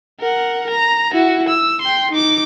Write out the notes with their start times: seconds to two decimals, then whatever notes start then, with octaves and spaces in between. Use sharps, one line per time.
0.20 A#4 F#5
0.70 A#5
1.12 E4 F#4
1.49 E6
1.82 G5 C6
2.11 D#4 D6